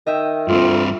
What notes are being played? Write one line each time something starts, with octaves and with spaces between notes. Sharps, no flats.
D#3 D#5 E5 G5
D2 G2 C4 F4